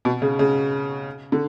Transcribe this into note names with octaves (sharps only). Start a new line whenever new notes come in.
B2
C#3
C#3
D3